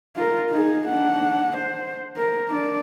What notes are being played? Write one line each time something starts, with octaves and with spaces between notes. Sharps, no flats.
F4 A#4
D#4 G#4
D4 F#5
C5
A#4
D4 D5